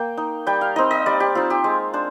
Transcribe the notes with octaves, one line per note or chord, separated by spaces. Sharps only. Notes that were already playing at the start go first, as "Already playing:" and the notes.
Already playing: A#3 G5
D#4
G3 G5
F5
C4 D#4 D#5
D#5
G3 D5
G4
C4 D#4 F4
G4
G#3
D4 C5